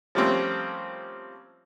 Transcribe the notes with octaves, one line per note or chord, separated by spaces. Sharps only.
F3 G3 A3 A#3 C4 C#4